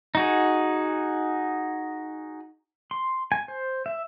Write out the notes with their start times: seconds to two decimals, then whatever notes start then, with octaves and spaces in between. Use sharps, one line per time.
0.15 D#4 F#4 G#4
2.91 C6
3.32 G#5
3.48 C5
3.86 E5